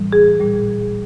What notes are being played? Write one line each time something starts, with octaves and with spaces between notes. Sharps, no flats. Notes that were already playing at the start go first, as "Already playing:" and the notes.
Already playing: A2 E3 G3
G#4
A#2 G3